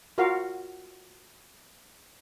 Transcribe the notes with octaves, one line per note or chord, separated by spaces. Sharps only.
F4 F#4 A#4 F5